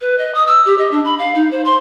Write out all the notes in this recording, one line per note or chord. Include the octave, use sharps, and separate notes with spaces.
B4
D#5
D#6
E6
G4
D#5
D4
B5
F5
D#4
C5
C6